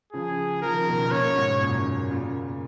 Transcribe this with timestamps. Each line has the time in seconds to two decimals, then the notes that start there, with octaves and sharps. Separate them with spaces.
0.13 C#3 F3 G#4
0.62 F3 A#4
0.71 D#3
0.80 C#3
0.88 B2 D#3
1.11 A#2 C#3 C#5
1.36 G#2 B2
1.61 F#2 A#2
2.10 A#2 C#3